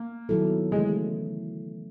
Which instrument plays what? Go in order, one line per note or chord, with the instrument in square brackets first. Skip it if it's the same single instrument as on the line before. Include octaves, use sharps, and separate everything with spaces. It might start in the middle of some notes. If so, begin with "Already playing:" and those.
Already playing: [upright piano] A#3
[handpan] D#3 F#3 B3 E4 A4
[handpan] C#3 E3 A3 [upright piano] G#3